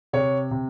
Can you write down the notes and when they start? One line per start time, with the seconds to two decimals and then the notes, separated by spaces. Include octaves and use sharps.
0.13 C3 C#5
0.51 C3